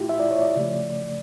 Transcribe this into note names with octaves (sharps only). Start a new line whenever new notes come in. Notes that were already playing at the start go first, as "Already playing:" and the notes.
Already playing: A#2 A3 E4 F4 G4
E5
D5
C#5
D5
C#3 F3 A3